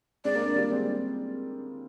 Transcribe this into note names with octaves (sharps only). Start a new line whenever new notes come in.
G#3 C4 D5
A#3 D4
A#3 D4
G3 A#3
G#3 C4